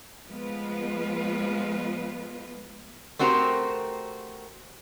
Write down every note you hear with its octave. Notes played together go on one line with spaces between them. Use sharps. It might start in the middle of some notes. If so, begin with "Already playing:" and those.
F3 G#3 A3 B3 F4 B4
A3 C4 F#4 G4 A#4 C5